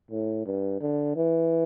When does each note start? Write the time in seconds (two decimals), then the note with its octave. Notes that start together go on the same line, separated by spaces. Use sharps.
0.11 A2
0.46 G2
0.81 D3
1.16 E3